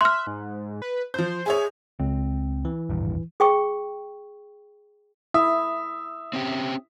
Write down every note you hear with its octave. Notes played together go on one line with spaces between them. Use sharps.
E5 C6 F6 F#6
G#2
B4
F3 C5 G6
G#4 C#5 E5 G#5
C#2 C4
E3
D#1 G#1 G2
G#4 G5 C#6
E4 E5 D#6
C4 C#4 G4